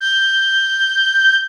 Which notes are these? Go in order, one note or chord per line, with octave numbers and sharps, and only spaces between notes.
G6